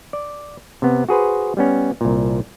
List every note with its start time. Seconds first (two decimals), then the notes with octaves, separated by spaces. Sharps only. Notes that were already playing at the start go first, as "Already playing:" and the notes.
0.13 D5
0.82 C3 B3
1.09 F#4 G#4 B4 C5
1.57 G3 B3 C#4
2.01 C2 A#2